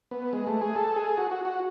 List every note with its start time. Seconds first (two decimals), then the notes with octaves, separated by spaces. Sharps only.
0.11 B3
0.33 G#3
0.47 A3
0.61 G#4
0.75 A4
0.96 G#4
1.17 F#4
1.31 F#4
1.45 F#4